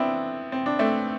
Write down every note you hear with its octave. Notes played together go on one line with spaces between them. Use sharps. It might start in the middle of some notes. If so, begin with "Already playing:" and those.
Already playing: B3 C4 D4 E4
C4
D4
A3 C4